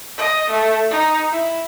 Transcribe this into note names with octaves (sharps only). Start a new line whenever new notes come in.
D#5
A3
D#4
E4